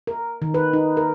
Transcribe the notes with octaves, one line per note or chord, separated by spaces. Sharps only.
A#4
D#3
B4
D#4
A#4